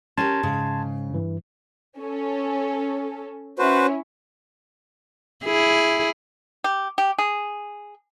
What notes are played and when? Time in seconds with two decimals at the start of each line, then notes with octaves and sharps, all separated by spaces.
0.18 C#4 G4 A#4 A5 C6 G#6
0.43 G#2 C#3
1.10 G2 E3
1.99 C#4 A4
3.59 C#4 E4 F#4 B4 C5
5.45 E4 G#4
6.64 G4
6.98 G4
7.19 G#4